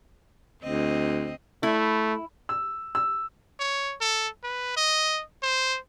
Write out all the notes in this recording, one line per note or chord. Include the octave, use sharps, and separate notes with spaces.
D2 C4 D#5
A3 E4
E6
E6
C#5
A4
B4
D#5
C5